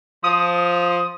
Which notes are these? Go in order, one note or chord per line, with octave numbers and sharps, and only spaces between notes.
F3 D#6